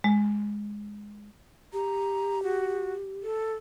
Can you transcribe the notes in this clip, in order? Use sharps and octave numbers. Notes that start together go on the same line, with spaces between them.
G#3
G4 A#5
F#4
A4